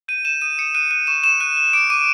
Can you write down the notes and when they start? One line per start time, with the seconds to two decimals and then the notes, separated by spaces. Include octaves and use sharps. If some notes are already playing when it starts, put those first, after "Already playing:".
0.08 G6 D#7
0.25 G6 E7
0.41 D#6 D#7
0.58 D#6 C#7
0.74 F#6 D#7
0.91 F#6 D#7
1.07 C#6 E7
1.24 C#6 E7
1.40 F#6 D#7
1.57 F#6
1.73 D6 D7
1.90 D6 D#7